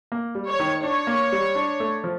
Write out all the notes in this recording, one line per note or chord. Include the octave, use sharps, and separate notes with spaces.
A#3
G3
C#5
D#3
D4 C#5
A#3
G3
D4
A3
F3